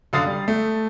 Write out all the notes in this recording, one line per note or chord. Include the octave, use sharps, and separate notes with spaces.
F#2 D3 F5 D#6 A6 C7
G3
A3